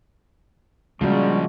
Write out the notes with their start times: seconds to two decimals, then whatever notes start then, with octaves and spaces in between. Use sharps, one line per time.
1.01 A#2 C#3 F3 G3 G#3 F#4